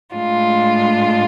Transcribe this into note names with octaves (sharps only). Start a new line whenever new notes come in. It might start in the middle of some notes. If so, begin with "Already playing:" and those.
A2 G#3 D4 F4